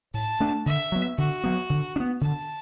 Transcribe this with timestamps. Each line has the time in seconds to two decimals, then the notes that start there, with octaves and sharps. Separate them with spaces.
0.14 A2 A5
0.40 A3 D4
0.66 D3 E5
0.92 F#3 B3
1.18 D3 F#4
1.44 F#3 B3
1.70 D3
1.96 D4
2.00 B3
2.21 D3 A5